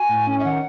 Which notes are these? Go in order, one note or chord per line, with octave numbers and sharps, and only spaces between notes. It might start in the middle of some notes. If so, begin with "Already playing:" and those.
Already playing: F#4 G#5
A2
C#4
E5
D#3 F#5